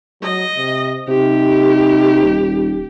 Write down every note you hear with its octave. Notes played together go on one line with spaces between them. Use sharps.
F#3 D#5
C3
C3 D#4 G4
D#1